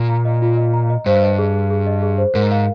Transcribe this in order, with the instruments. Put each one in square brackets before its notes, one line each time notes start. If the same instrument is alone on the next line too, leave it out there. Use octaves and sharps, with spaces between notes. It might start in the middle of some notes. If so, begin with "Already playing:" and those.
Already playing: [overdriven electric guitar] A#2
[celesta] A#5
D#5
F4
D#5
A#5
D#5
[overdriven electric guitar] G2 [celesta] C5
[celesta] D#5
G#4
G#4
G#4
D#5
G#4
C5
[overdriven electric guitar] G#2 [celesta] A#4
[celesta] F5